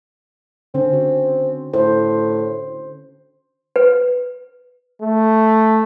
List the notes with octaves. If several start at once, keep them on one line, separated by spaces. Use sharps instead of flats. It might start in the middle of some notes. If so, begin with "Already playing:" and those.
D3 C4 C#4
F#4
A2 C5
B4
A3